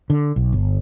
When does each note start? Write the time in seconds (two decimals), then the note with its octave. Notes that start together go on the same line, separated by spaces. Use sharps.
0.10 D3
0.36 B1
0.53 G1